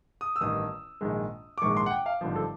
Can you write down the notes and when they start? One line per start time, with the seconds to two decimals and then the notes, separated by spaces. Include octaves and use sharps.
0.21 D#6
0.36 E6
0.41 A1 G2 D#3 D#6
1.01 A#1 G#2 D#3 G#3
1.58 D6
1.62 A#1 G#2 D#3 G#3 C#6
1.77 C6
1.86 F#5
1.91 G5
2.06 F5
2.21 G#1 G2 D3 F3
2.36 A4